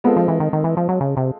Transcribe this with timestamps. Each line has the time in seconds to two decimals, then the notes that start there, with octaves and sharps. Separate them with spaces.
0.04 G#3 B3 C4 F4 A4
0.16 F3
0.28 E3
0.40 D#3
0.53 D#3
0.64 E3
0.77 F3
0.89 F#3
1.01 C#3
1.17 C3